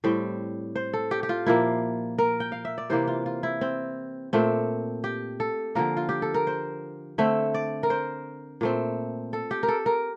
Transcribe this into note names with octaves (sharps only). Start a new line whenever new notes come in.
A2 G3 C4 C5
C5
A4
G4
G4
F4
A#2 F3 A#3 E4
A#4
G5
F5
E5
D5
C3 E3 A#3 C5
F4
F4
E4
C4
A#2 A3 C4
G4
A4
D3 F3 A#3 A#4
F4
G4
A4
A#4
C5
D3 A3 C4 E5
D5
A#4
C5
A#2 A3 C4
A4
G4
A#4
A4
A#4